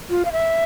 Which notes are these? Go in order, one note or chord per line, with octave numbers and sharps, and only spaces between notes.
F4
F5
E5